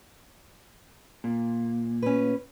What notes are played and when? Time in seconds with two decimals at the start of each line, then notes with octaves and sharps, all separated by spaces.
1.24 A#2
2.02 C#4 B4